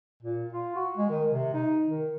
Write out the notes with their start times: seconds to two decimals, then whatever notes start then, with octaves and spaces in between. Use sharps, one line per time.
0.23 A#2
0.52 F4
0.76 F#4
0.97 G#3
1.09 D#3
1.32 C3
1.53 D#4
1.87 D#3